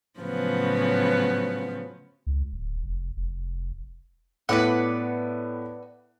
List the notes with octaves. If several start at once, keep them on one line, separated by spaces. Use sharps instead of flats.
A2 C#3 F3 F#3 B3
C#2
D1
F1
F1
A2 B3 E4 B4 D5 F#5